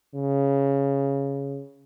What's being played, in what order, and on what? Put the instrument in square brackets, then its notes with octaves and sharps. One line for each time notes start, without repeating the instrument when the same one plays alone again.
[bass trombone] C#3